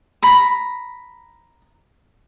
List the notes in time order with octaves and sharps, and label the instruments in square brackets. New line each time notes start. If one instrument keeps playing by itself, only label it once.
[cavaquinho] A#5 B5